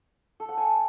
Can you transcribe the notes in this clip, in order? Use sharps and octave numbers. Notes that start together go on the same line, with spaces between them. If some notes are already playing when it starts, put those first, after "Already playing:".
A4
F#5
G#5